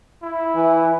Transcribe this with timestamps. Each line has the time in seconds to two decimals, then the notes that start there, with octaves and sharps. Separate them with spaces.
0.22 E4
0.55 E3